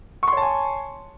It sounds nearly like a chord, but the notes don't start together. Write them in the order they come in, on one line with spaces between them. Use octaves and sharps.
C#6 C6 C#5 A5 G#5